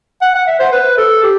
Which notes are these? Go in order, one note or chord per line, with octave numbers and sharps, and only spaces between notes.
F#5
F#5
E5
C5
B4
A4
G4